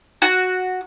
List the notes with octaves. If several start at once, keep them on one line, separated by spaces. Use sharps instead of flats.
F#4